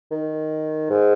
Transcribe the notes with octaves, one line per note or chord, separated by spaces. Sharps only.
D#3
G#2